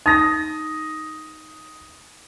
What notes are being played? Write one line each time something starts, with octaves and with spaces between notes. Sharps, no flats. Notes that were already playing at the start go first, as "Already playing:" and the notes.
D#4 D#6 A#6